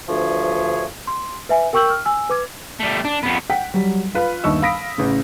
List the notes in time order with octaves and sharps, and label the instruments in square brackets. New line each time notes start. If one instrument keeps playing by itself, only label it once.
[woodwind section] D2 G2 F3 G#4 C#5 E5
[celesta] C6
B4 E5 G#5
A#4 G5 C#6 E6 G6 F#7
F6
G#5 E6
B4 D6 G#6
[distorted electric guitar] G3 A3
D4
F2 B3
[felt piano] F#5 G5 B6
F#3 G3
F4 B4 F5 B5
G1 D#2 D#3 D#5 C#6 E6
F5 B5 D#6 A#6 B6 D7
A1 C#3